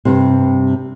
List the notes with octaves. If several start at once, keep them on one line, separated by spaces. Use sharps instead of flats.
G2 C3